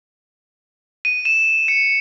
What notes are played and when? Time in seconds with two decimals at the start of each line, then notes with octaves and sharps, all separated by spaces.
1.05 D#7
1.25 E7
1.68 C#7